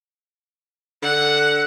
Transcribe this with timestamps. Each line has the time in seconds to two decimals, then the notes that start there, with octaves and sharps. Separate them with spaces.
1.03 D3 F#5